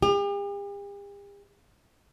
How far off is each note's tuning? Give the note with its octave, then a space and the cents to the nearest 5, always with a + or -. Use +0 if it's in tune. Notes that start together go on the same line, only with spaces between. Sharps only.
G4 +45